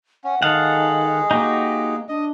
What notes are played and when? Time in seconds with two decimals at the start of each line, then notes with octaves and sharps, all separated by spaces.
0.24 C#4 F#5
0.42 D#3 G#3 G#4 A4 F5 F#5
1.31 A#3 D#4 F#4 G4
2.09 D4 D#5